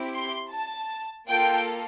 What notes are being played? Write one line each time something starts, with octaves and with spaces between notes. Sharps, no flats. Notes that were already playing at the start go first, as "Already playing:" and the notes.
Already playing: C4 E4 G4
C6
A5
A#3 F4 A4 G5